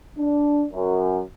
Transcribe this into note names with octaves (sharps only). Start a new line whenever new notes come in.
D4
F#2